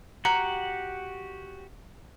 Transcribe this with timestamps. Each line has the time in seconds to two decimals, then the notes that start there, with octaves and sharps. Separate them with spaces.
0.25 F#4 G4 F#5 A#5